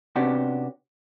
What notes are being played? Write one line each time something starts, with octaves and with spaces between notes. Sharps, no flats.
C3 B3 C#4 D4 F#4 G4